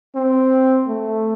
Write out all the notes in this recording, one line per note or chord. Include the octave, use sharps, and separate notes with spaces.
C4
A3